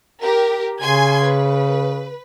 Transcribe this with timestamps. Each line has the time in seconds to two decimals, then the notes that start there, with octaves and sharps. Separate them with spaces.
0.22 G4 A#4
0.82 C#3 G#5 C6 G#6
1.24 B4